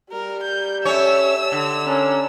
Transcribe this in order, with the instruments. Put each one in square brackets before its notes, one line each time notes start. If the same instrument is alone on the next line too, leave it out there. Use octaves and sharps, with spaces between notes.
[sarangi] G3 [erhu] A#4
[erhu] G6
[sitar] C#4 C#5 [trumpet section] A4 E5 [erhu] E6
[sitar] D3
[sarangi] C#4 [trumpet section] D4 A4 A#4